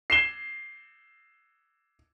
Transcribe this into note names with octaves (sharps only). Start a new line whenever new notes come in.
C7 E7 G7